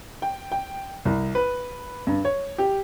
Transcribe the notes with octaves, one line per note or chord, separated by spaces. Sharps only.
G5
G5
C2
B4
G2
C#5
G4